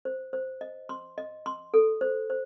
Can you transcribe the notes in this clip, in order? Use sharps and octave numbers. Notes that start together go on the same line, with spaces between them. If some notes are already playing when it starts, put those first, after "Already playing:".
C5
C5
D#5
C6
D#5
C6
A4
C5
C5